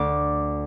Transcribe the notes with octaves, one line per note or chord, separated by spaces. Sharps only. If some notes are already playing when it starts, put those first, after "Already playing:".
Already playing: D2 D6